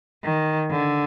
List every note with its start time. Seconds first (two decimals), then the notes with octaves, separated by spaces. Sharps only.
0.24 D#3
0.71 D3